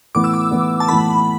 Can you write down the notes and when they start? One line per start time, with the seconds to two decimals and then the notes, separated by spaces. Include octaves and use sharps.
0.15 A2 E3 B3 D6
0.24 E6
0.34 D6
0.51 A2 E3 B3
0.80 A5
0.88 A2 E3 B3 B5